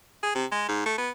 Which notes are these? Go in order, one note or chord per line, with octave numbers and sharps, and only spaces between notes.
G#4
C3
G#3
G#2
A3
B3